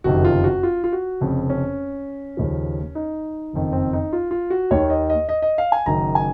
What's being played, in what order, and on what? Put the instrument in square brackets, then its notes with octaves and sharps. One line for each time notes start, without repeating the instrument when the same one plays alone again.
[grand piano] F#1 F2 C3 D#3 F#4
F4
F#4
F4
F4
F#4
F1 F2 C#3
C#4
D#2 C#3 F3
D#4
F#1 F2 D#3
C4
D#4
F4
F4
F#4
D#2 D#3 C#5
D#5
D#5
D#5
D#5
F5
G#5
F#1 F#2 D#3 A#5
G#5